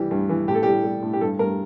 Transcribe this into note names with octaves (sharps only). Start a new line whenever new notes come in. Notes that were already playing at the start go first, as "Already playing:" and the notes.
Already playing: C2 E3 G3 G4
G2
E3
A2 G4
A4
G3 G4
G3
A2
G4
G2 A4
G2 A#4